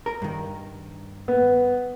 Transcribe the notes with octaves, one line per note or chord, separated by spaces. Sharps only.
A#4
G2 D#3
B3